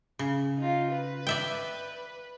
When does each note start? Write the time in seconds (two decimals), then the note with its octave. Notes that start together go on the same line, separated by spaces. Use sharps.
0.19 C#3
0.57 D#4 F4
0.92 B4
1.27 D5 E5 G5